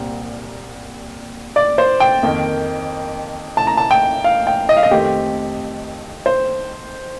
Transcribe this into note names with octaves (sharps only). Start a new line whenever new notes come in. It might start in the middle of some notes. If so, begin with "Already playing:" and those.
Already playing: C2 A#2 G3 C4
D5
C5
G5
F2 D#3 A#3
A5
A#5
A5
G5
F5
G5
D#5
F5
D#5
F2 D#3 A3 C4 G4
C5